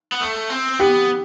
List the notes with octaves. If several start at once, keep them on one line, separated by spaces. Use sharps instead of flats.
B3
A3
C4
B3 G4